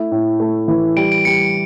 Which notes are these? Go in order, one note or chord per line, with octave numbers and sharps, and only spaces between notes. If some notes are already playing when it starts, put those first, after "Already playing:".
Already playing: A3 E4
A2
A3
E3
G3 D7
D7
G3 C#7